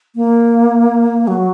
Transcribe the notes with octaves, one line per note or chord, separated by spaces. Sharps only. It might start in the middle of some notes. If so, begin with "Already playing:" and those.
A#3
F#3